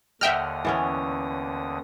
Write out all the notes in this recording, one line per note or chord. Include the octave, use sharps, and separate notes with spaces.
D#2 D3 D#5 E5 F#5 G5 D#6 F6
E3 B3 C#4